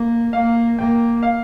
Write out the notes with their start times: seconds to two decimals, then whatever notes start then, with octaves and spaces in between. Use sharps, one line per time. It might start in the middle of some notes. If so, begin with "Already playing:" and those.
Already playing: A#3
0.33 A#3 F5
0.78 A#3 G5
1.23 F5